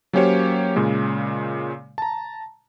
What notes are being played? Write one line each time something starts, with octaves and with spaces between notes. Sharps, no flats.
F#3 A#3 C#4 G4 C5 C#5
A#2 C#3 G#3
A5 A#5